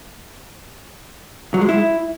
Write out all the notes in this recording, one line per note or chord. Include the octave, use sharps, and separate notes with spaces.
F#3
G#3
E4